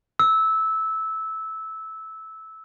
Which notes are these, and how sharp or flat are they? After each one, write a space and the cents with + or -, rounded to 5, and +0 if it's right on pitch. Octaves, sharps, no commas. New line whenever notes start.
E6 -15